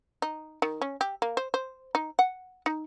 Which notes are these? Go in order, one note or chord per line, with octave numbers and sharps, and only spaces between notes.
D#4
D#3
C#4
G4
A#3
C5
C5
D#4
F#5
D#4